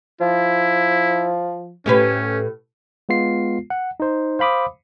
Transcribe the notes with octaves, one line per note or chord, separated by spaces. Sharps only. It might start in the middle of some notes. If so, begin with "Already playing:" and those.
F3 E4
A2 C#4 G4 B4
G#3 B3 F4 C7
F#5
D#4 C5
C5 F5 B5 D6 D#6